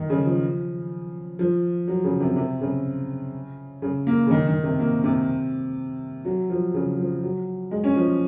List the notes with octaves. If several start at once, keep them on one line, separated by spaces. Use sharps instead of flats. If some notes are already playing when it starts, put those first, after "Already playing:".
Already playing: D#3
C#3
F3
F3
F#3
C#3
C3
C3
C#3
C#3
A#3
C#3
D#3
D#3
C3
A#3
C3
F#3
F3
C#3
F3
F#3
G#3
C#4
F3